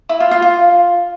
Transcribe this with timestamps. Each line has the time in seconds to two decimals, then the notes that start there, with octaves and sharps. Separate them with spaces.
0.09 E4
0.20 F4
0.31 F4
0.42 F4